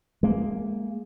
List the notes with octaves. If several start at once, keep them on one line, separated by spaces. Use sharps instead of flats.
G#3 A#3